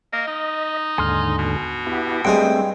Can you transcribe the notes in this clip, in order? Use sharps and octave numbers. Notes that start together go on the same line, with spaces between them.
A#3 D#5
D#4
D#2 G#2 D3 G#5 C6 F6
B2
B3 E4 G4
G2 G#3 A3 C4 G5 D#6